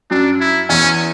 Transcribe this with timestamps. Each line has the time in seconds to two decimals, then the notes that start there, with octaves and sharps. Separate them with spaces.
0.10 F#2 F#3 D4
0.40 E4
0.69 E2 E3 C#4